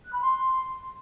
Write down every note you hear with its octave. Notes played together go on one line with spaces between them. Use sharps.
F#6
B5
C6